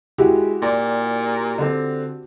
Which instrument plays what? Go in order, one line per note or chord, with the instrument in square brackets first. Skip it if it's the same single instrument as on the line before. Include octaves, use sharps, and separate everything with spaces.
[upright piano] G#3 [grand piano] E4 F#4 G4
[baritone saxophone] A#2 [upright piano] D5
[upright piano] D3 C4